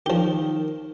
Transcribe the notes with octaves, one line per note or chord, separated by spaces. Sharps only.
D#3 F3 G4